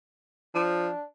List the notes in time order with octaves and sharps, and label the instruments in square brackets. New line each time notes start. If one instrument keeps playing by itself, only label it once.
[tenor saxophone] F3 [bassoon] D4